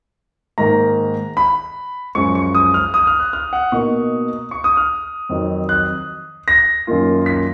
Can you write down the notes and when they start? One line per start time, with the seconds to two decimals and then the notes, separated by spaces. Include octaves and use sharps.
0.58 G#2 D#3 A#3 A#5
1.37 B5
2.15 F#2 F3 G#3 C#6
2.35 C#6
2.55 D#6
2.74 F6
2.94 D#6
3.07 F6
3.20 F#6
3.33 F6
3.53 F#5
3.72 B2 A#3 D#4 C#6
4.51 C#6
4.64 D#6
4.77 F6
5.29 F2 D#3 F#3
5.69 F#6
6.48 A#6
6.87 F#2 D#3 A#3 F4
7.26 B6